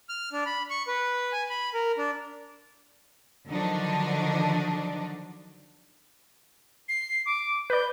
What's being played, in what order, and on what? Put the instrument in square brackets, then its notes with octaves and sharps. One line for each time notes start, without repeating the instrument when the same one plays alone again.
[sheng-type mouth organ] F6
D4
B5
C#6
B4
G#5
B5
A#4
D4
[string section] D3 D#3 F3 F#3 D4 D#4
[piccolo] C7
D6
[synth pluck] B4 D5 [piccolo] G6